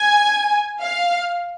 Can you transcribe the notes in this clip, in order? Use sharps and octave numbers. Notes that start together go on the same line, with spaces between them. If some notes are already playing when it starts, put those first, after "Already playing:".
Already playing: G#5
F5